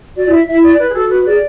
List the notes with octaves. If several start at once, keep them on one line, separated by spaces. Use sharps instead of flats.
F#4 D5
E4 E5
E4 E5
D5
B4
G#4
F#4 A4
F#4 B4
G#4 D5